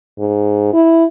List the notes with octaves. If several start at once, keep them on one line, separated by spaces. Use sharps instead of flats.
G#2
E4